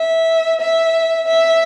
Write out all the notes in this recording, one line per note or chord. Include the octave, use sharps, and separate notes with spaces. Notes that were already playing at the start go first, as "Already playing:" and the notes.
Already playing: E5
E5
E5